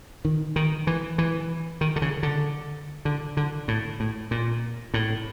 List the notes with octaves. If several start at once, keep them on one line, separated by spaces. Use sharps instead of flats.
D#3
D#3
E3
E3
D#3
D3
C#3
D3
D3
D3
A2
A2
A#2
A2